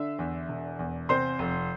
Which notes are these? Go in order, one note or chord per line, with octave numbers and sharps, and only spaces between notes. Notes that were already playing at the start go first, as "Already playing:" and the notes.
Already playing: D3 E5 E6
E2
E1
E2
C3 C5 C6
F1